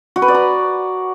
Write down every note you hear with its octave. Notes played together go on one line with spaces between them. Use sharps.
F#4
B4
D5
A#5